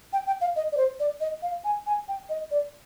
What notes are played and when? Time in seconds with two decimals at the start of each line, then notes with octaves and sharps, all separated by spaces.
0.13 G5
0.27 G5
0.41 F5
0.56 D#5
0.72 D5
0.77 C5
1.00 D5
1.20 D#5
1.42 F5
1.64 G#5
1.87 G#5
2.08 G5
2.29 D#5
2.51 D5